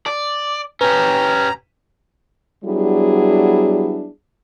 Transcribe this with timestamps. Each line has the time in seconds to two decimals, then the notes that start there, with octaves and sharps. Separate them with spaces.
0.06 D5
0.81 C#4 G4 B4 A#5
2.65 F#3 G3 B3 D4 E4 G#4